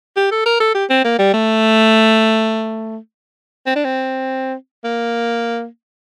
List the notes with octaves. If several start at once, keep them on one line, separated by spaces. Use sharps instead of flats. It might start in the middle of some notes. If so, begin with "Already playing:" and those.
G4
A4
A#4
A4
G4
C4
A#3
G3
A3
C4
D4
C4
A#3